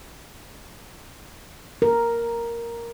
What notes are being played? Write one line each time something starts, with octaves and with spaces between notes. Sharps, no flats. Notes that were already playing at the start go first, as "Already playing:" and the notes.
A#4